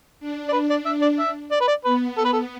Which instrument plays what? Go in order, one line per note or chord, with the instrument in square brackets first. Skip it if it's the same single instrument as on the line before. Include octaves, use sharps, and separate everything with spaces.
[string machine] D4
[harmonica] D5
B4
D5
E5
D5
E5
D5
B4
D5
[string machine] B3 [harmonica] B4
[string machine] B3 [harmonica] A4
[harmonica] B4
A4